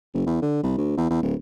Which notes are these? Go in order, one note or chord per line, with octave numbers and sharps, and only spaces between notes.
F#1
E2
D3
C2
D2
E2
E2
D1